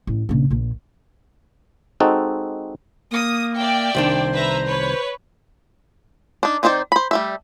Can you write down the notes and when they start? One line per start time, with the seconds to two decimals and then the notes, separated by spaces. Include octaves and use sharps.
0.07 A1
0.29 A#1 C#3
0.51 A#1 A#2
2.00 G#3 C4 D#4 F#4 A4
3.11 A#3 D#6
3.56 D5 E5 G5
3.95 C2 D#3 D4 C5
4.33 B4 E5 A#5
4.66 B4 C#5
6.43 D4 D#4
6.63 D#3 C4 D#4 C5 D5
6.92 C5 B5
7.11 G3 A3 E5